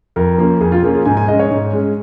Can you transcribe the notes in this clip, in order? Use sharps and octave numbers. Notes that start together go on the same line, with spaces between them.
F2 A#4
F3 A#3 C#4
F2 G#4
F4
F3 A#3 C#4 G#4
G#4
G#2 G#5
G#5
G#3 C#4 D#5
C#5
G#2
G#3 C#4